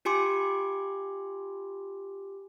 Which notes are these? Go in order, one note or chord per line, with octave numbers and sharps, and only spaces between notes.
F4 G4 G#5 C6 D6